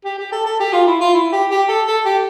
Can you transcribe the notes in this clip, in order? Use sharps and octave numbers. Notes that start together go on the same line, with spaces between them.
G4
G4
A4
A4
G4
F4
E4
F4
E4
G4
G4
A4
A4
G4